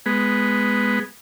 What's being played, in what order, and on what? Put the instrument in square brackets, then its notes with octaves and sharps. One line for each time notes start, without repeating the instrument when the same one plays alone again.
[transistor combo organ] G#3 B3